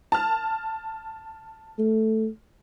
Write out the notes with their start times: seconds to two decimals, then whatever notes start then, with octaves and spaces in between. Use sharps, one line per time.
0.12 A5 F6
1.79 A3